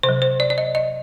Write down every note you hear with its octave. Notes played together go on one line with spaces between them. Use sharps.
C3 C5
F#3
C5
D5
D5
D#5
D#5